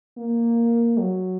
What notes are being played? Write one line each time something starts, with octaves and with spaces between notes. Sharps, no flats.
A#3
F#3